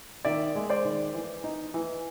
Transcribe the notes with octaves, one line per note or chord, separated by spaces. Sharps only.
D#3 D5 E5
G#3
C5 D5
D#3
E3
D#4
E3